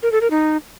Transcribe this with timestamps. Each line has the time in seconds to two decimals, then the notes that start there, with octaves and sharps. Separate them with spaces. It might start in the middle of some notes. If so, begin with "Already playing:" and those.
0.03 A#4
0.12 A4
0.21 A#4
0.31 D#4